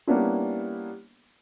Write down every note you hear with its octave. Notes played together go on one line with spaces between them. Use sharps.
G3 A#3 B3 C#4 D4 E4